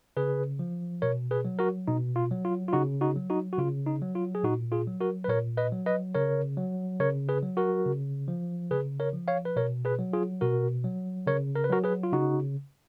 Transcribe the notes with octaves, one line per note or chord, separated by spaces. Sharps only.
C#3 G#4 B4
F3
B2 A#4 C#5
G#4 B4
F#3
F#4 A#4
B2 D#4
F4
F#3
F4
F4
C#3 D#4 F#4
D#4 F#4
F#3
D#4 F#4
F#4
C#3 F4
D#4
F#3
F4
G#4
A#2 D#4 F#4
F4 G#4
F#3
F#4 A#4
B4
A#2 A#4 C#5
B4 D#5
F#3
B4 D#5
C#3 A#4 C#5
F#3
C#3 A#4 C#5
G#4 B4
F#3
F#4 A#4
C#3
F3
C#3 G#4 B4
A#4 C#5
F3
C#5 F5
B4
B2 A#4 C#5
G#4 B4
F#3
F4 G#4
B2 F#4 A#4
F#3
C#3 A#4 C#5
A#4
B4
F#3 F#4 A#4
G#4 B4
F4
C#3 D#4 F#4